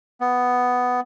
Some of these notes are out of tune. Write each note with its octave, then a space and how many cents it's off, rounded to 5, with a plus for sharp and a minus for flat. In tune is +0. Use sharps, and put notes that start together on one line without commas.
B3 +5